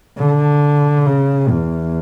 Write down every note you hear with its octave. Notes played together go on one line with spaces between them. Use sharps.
D3
C#3
E2